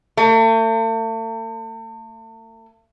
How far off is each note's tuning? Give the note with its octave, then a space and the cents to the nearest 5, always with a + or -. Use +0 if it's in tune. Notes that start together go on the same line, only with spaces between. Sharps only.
A3 +40